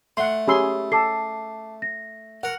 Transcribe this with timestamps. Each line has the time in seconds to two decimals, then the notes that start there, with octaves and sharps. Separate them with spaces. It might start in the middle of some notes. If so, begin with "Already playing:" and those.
0.17 A3 F#5 C6
0.48 C#4 G4 G#4 B5 C6 E6
0.92 A4 A5 D6 C7
1.82 A#6
2.43 A#4 F#5